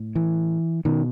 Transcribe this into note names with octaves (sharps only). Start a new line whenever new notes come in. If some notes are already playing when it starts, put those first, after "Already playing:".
Already playing: A2
E3
B2 D#3